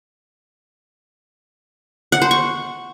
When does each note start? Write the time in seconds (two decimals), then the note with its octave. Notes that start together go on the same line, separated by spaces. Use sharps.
2.12 F#5
2.22 C5
2.31 C#6